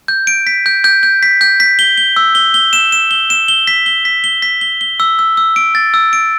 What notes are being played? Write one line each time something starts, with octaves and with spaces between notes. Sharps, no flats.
G6
D7
B6
G6
G6
G6
B6
G6
B6
G7
G7
E6
G7
G7
E7
E7
G7
E7
G7
B6
G7
B6
G7
B6
G7
G7
E6
E6
E6
D7
A6
E6
D7